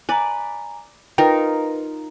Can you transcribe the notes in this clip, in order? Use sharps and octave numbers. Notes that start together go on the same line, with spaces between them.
B4 D5 G#5 A#5
D#4 F4 A#4 B4 G5